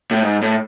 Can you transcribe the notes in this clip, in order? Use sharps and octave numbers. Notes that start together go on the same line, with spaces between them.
A2
G#2
A2